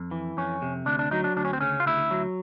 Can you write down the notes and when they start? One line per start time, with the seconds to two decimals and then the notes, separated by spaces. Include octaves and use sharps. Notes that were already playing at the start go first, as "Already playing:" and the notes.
Already playing: F2
0.11 E3
0.37 F2 C#4
0.62 C3
0.86 D2 D4
0.99 D4
1.11 F#3 D#4
1.24 D4
1.37 D2 D4
1.45 C#4
1.53 C4
1.61 C#3 C#4
1.80 F4
1.86 D2 E4
2.11 F#3